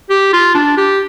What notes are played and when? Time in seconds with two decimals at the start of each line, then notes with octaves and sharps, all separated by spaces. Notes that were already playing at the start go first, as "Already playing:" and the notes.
0.10 G4
0.33 F4
0.55 D4
0.77 G4